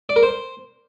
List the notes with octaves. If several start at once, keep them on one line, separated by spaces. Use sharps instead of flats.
D5
A#4
C5